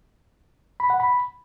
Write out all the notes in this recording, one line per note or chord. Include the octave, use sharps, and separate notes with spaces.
B5
F#5
B5